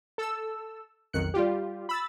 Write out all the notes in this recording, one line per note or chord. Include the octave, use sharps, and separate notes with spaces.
A4 E6
B1 F2 D#3 F#6 C#7
G3 F4 G4
B5 E6 A6